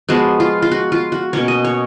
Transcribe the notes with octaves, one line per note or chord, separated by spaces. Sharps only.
F3 G#3 B3 F4 F#4
F4
F4
F#4
F4
F#4
B2 A#3 C#4 C#5
D#5
C#5